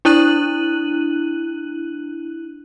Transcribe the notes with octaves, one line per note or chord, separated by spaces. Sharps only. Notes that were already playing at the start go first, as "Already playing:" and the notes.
D4 E4 F#6 D#7 F#7